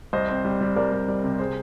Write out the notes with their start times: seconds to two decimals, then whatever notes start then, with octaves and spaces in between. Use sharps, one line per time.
0.13 C2 C5 D#5
0.29 C4
0.45 G3
0.61 G3
0.76 C2 A#4 D5
0.92 C2
1.08 G3
1.24 C3
1.39 G#4 C5